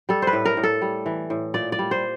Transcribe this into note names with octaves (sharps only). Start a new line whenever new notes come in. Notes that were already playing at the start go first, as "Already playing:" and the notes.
G3 A4
B4 C5
A2
A#4
A2
A4
G3
E3
A2
A#2 D5
D5
G3
C5